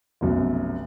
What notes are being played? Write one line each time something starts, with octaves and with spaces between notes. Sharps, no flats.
F1 B1 F#2